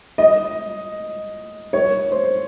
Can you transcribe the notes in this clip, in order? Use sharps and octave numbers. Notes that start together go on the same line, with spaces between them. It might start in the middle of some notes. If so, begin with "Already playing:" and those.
D#5
C#5
C5